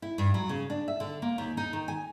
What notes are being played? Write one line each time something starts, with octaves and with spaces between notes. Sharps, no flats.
E4
G2
F#3
C#3
D4
E5
D3
A#3
D#2
D#4
D#3
G#5